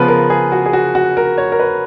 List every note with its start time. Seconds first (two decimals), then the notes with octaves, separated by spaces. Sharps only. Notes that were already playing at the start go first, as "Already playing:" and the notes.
Already playing: C#3 F3 B3 B4
0.08 A#4
0.30 G#4
0.52 F#4
0.66 G#4
0.73 F#4
0.95 F#4
1.17 A#4
1.38 C#5
1.52 A#4
1.59 B4